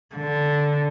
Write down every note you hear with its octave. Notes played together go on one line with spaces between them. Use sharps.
D3